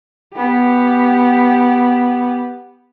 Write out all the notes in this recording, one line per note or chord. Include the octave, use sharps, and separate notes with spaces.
B3 G4